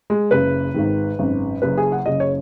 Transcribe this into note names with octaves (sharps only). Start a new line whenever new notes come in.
G#3
F#1 F#2 C#3 B4
G#1 G#2 D#3
G#1 F#2 C#3
F#1 F#2 C#3 B4
G#4
F#5
F#1 F#2 C#3 D#5
C#5